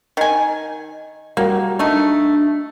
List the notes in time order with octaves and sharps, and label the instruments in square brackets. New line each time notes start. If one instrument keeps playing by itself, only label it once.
[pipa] D#3 G#5
[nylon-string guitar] G3 F#4 F5 [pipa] A#3
[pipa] A3 D#4 [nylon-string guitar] D4